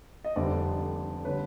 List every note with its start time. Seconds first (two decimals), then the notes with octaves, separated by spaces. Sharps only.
0.24 D#5
0.36 F1 F2 D3 G3 C5 D5
1.25 D3 G3 B4 C#5